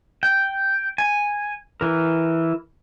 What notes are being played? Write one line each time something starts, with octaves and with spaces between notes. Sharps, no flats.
G5
G#5
E3 A#4